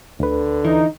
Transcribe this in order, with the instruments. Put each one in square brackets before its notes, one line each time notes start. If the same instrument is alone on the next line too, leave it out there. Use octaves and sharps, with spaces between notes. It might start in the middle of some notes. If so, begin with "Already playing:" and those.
[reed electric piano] D2 B4 [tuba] D3
[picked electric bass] E3 [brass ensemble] D#4